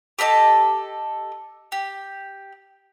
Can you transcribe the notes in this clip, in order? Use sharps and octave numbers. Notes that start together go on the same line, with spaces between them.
G4 A4 D#5 A5
G4